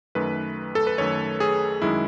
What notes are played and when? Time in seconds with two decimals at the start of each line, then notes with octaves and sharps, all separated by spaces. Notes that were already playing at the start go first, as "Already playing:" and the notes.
0.15 F#2 D#3 A3 B4
0.75 A4
0.87 B4
0.98 F#2 D#3 A3 C#5
1.40 G#4
1.82 F#2 D#3 G#3 E4